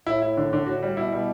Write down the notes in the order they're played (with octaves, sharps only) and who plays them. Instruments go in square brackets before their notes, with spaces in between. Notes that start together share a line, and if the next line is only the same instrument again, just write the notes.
[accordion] A2 [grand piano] E4
[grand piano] E4
D3
D3
[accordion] A2 [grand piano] F#4
[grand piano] G3
[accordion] B2 [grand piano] E4
[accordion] B2 [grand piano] G3